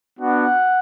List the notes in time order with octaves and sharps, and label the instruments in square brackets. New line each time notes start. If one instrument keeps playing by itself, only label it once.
[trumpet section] B3 D4 F#4 F#5